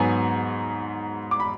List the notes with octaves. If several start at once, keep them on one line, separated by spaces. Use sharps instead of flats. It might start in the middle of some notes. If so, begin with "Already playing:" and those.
Already playing: G#2 F#3 B3 G#5
D6
B5